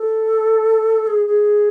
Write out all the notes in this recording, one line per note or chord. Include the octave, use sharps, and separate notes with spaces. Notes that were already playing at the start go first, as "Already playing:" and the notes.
Already playing: A4
G#4
G#4